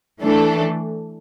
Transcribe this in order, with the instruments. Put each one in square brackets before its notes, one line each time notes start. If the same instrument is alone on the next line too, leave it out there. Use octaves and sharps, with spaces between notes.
[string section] E3 A3 D4 A4